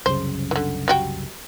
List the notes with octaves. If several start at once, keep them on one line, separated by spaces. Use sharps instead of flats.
C2 F#2 C#3 C5
D3 E3
G3 F#4 G5